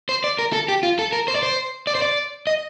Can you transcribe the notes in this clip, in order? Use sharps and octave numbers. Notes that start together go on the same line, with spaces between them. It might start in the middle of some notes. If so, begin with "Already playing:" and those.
C5
D5
A#4
A4
G4
F4
A4
A#4
C5
D5
C5
D5
C5
D5
D#5